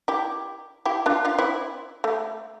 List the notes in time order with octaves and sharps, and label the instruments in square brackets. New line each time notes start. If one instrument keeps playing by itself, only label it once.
[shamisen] E4 G4
E4 G4
D4 F4
D4 F4
C4 E4
A3